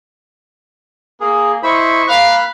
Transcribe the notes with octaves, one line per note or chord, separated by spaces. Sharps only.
A#3 G#4
E4 C5 D#5 B5 C#6
A#3 F5 B5 F#6